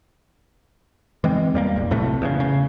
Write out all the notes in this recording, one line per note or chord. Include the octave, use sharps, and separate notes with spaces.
E3 G#3 C4
E2 G3 A3 A#3
F1 B1
B1 A2 C3 A3
E2 C#3
C#3